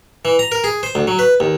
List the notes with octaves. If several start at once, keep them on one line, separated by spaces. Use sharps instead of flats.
E3
A#5
A#4
G#4
C5
D2
F#3
B4
D#2